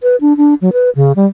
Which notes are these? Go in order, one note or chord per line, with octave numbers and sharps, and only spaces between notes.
B4
D4
D4
F#3
B4
C#3
G3